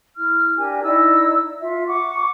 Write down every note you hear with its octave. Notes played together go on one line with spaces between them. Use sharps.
E4 F6
D4 G4 A#4 G#5
D#4 E4 D5 E6
F4 E5
F#5 C#6 D6